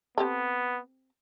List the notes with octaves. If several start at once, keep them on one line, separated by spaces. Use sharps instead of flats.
B3 C4 G4 A4